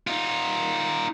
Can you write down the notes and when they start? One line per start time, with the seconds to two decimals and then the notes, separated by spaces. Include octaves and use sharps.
0.07 D#4 F4